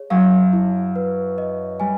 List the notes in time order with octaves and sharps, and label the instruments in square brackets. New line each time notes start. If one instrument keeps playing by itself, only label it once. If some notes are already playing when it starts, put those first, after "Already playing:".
Already playing: [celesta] G#4 C#5
[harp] F#2 F#3 [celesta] F5
[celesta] E4
B4
D#5
[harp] G3 [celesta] G#5